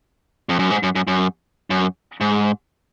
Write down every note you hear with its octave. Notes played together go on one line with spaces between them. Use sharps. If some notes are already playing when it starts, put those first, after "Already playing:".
F2
F#2
G#2
F#2
F#2
F#2
F#2
G#2